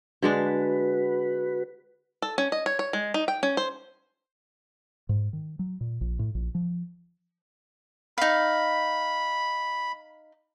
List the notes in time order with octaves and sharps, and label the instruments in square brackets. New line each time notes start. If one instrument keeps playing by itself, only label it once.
[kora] D3 G#3 D4 [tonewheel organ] F#4 B4
[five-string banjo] A4
C#4
D#5
C#5
C#5
G#3
D#4
G5
C#4
C5
[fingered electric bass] G#2
D#3
F#3
A#2
A#1
A2
A#1
F3
[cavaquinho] D#4 F5 [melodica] B5